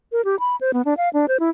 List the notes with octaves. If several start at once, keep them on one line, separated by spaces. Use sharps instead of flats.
A#4
G4
B5
C5
B3
D4
F5
D4
C5
E4